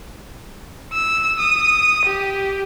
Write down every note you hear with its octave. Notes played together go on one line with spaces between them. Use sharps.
E6
D#6
G4